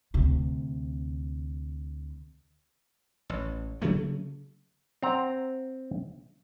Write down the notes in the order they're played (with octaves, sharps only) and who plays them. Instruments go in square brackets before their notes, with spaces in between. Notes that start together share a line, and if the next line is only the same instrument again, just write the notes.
[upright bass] D2 C3
[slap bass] A1
C#3 F#3 A3 A#3
[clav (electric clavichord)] C4 F#5 A#5